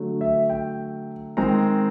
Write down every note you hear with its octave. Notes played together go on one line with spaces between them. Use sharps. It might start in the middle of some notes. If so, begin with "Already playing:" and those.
Already playing: D3 F#3 A3
E5
G5
D#3 G#3 C4 A#5